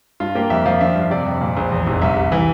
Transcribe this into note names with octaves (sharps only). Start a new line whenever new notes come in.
G2 F4
A#3 G4
F2 E5
F3 F5
D4 E5
G2
C3 D5
F2
A#2
A#1
E2
F1
C2 E5
C2
E3